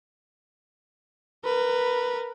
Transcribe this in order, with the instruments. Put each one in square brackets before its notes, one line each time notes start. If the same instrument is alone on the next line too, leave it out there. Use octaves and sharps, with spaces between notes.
[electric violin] A#4 B4